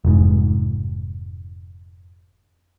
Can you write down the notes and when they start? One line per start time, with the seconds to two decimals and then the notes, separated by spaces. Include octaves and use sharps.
0.05 F1 G#2